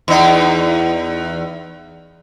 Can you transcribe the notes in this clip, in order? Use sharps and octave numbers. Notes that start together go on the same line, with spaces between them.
E2 D#4